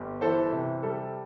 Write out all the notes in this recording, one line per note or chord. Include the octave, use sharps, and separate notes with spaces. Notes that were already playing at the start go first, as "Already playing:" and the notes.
Already playing: G1 G3
E3 A4 C5
C3
G3 A4